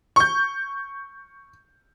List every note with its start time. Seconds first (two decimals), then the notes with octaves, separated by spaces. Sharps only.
0.16 C#6 G6